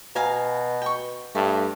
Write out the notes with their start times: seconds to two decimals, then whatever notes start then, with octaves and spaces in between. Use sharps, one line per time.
0.15 B2 F5 G#5 A#5
0.82 G5 C#6
1.35 G2 A3 D5